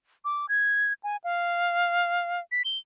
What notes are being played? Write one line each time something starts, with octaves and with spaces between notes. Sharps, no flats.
D6
G#6
G#5
F5
B6
G7